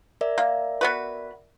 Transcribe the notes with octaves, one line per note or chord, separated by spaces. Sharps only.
A#4 D5 E5
A#3
B3 F#4 B4